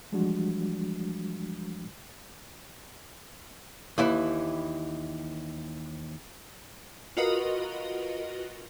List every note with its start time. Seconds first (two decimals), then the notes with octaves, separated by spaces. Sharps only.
0.12 E3 F3 G3 G#3 D4 F#4
3.98 D#2 E3 E4
7.17 F4 F#4 A#4 B4 D#5